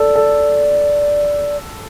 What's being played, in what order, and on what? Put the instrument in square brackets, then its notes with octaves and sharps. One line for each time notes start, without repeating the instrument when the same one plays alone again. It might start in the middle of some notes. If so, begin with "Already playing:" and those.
Already playing: [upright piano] A4 [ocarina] D5
[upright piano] A4